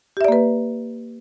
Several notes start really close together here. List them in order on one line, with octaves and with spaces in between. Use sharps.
G4 E5 D5 A#3 B4